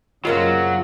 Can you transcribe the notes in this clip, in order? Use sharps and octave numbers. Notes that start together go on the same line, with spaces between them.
F#2 C#3 F#3 G#3 A#3 C4 F4